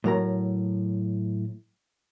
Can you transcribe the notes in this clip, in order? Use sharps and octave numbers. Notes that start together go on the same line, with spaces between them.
A2 F#3 A#4 A#5